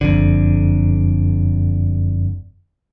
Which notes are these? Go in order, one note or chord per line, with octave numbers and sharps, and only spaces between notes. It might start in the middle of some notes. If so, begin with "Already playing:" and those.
F#1 F2 D3